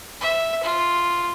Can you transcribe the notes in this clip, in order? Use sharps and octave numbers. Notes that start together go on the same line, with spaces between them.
E5
F4